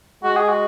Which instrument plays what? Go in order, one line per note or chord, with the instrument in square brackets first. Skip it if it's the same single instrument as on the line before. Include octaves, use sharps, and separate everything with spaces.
[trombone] G#3 [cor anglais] F#4
[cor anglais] G#4
F#4